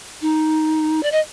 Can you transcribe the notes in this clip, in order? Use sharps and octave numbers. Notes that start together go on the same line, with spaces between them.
D#4
D5
D#5